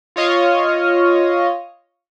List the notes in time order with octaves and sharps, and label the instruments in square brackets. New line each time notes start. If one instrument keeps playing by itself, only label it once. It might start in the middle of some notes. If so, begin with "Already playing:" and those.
[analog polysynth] F4 C#5 D#5 F5